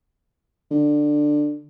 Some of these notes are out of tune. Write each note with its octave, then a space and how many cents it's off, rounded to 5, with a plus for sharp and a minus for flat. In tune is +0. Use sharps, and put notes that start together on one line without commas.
D3 +10